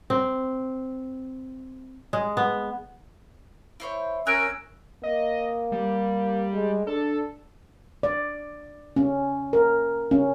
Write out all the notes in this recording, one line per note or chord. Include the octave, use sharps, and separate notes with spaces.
C4
G#3
B3
E4 C5 C#5
C#4 A#4 G#5 E6 F#6 D7
A#3 D#5
G3
G#3
D4 A4
D5
C#4
A#4
C#4